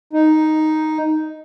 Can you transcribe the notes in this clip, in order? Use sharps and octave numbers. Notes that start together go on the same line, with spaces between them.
D#4